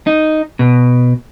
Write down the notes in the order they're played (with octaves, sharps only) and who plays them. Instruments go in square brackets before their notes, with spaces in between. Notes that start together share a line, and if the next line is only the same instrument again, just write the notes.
[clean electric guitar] D#4
B2